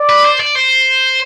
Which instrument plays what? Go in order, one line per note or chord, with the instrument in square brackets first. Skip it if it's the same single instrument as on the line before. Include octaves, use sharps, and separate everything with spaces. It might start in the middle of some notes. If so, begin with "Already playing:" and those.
Already playing: [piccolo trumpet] D5
[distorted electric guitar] B4
C5
D5
C5